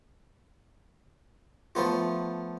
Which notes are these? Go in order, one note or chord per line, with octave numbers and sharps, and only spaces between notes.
F3 A3 B3 F4